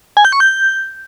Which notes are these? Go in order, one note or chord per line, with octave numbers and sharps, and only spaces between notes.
G#5
G6
C#6
G6